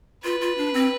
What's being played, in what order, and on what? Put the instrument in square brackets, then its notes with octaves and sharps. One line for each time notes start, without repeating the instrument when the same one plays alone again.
[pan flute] F4 [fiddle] B4
[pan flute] F4
D4
C4